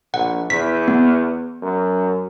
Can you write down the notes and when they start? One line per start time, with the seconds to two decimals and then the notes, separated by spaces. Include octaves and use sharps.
0.14 A#1 F#5
0.50 E2 B6
0.88 B3
1.62 F#2